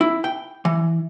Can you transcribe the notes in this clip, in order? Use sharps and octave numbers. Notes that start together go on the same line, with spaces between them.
E4
G5
E3